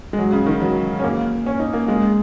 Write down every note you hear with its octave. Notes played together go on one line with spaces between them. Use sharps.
G#3
F#3
C#3
D#3
F#3
C#4
A#3
C#4
D#4
A#3
G#3